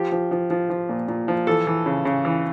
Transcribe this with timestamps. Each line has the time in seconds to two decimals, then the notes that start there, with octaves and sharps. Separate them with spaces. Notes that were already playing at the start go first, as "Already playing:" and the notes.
Already playing: F3 G4
0.12 F3
0.31 F3
0.50 F3
0.70 F3
0.89 A#2
1.08 A#2
1.28 F3
1.47 E3 A4
1.67 E3
1.86 C#3
2.05 C#3
2.25 E3